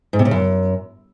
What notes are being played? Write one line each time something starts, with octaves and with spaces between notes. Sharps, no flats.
G#2
C3
C#3
F#2